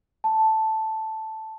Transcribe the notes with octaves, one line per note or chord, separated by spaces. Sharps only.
A5